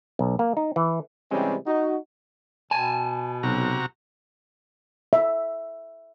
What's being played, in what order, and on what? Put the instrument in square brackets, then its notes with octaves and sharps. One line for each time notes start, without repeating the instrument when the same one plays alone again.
[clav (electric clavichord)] B1
A#3
D#4
E3
[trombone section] C3 E3 G3 G#3 C4 C#4
D#4 F#4
[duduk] B2 [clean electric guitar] G#5 A5
[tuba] B1 [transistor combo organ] C3 F#4 A#5
[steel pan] E5